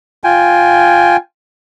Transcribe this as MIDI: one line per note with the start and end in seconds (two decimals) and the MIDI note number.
0.24 1.17 65
0.24 1.17 79
0.24 1.17 80